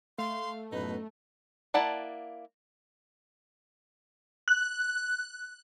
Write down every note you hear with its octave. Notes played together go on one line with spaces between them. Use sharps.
A3 F5 C6
A1 F#2 B2 D#4 B4
A#3 E4 D5 F#5 A5
F#6